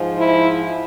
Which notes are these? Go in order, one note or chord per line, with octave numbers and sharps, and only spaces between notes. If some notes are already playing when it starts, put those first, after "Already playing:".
Already playing: G#2 F3
E4